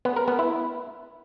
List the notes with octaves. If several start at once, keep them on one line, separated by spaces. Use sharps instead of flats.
B3
A#4
B3
E4